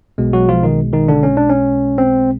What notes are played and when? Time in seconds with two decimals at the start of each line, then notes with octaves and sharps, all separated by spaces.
0.18 B1 B2 G#3
0.33 F#3 F#4
0.49 F3 F4
0.63 D#3 D#4
0.93 D#3 D#4
1.08 D3 D4
1.23 C#4
1.37 D4
1.49 C#4
1.98 C4